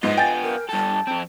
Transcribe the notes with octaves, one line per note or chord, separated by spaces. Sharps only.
G#2 B3 F4 D#5
G5 G#5 A6
A#4
G2 A4 A5
F2 C4